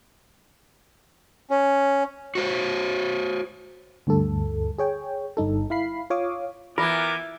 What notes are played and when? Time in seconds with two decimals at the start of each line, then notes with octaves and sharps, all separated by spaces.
1.50 C#4
2.35 F#4 C5 C#5
4.07 D2 G2 A4
4.78 G#4 C#5 G5
5.37 G1 G2 D#4 A4
5.70 E4 F5 B5 C7
6.10 F4 C#5 F5 D6 D#6
6.78 E3 B3 F4 A#4 G#5 D6